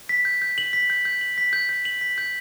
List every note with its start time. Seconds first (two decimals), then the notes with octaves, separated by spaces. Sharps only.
0.09 B6
0.25 G6
0.42 G6
0.58 F#7
0.73 B6
0.90 G6
1.05 G6
1.21 F#7
1.38 B6
1.53 G6
1.69 G6
1.85 F#7
2.01 B6
2.18 G6